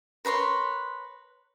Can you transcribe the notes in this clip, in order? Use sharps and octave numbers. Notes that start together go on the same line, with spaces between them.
A#4 B4 C#5 C6